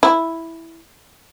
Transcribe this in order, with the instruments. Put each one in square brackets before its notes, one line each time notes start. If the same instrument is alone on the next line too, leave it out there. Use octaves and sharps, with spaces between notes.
[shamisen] E4